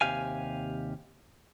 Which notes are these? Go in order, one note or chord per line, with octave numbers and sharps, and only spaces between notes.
D#2 C3 G4 F5 G#5